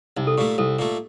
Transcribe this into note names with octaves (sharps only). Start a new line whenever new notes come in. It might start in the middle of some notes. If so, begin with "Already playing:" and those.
C2 D#4
A4
A#2 A3 G4
C2 A4
A#2 A3